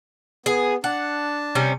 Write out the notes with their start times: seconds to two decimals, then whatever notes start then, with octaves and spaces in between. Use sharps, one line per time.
0.46 B3 G#4
0.84 D4 F#5 A5
1.55 C3 G3 C#4